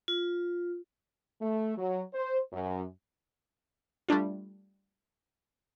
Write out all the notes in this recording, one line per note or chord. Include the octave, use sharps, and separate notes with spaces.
F4
A3
F#3
C5
F#2
G3 A3 D4 F4